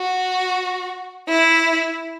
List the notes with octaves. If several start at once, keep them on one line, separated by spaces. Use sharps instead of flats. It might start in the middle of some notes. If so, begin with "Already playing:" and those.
Already playing: F#4
E4